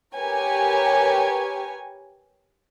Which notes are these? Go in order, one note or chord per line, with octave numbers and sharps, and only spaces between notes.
G4 A#4 B4 C#5 G#5